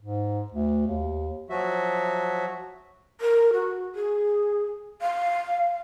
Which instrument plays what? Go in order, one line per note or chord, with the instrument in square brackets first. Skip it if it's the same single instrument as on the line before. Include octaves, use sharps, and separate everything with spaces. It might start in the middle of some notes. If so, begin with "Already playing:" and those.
[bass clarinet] G#2
D2
D#2
[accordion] F3 F#3 F#4 E5
[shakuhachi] A#4
F#4
G#4
F5